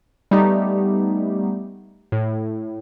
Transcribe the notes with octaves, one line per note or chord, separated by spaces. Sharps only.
G3 A3 B3 D#4 G4
A2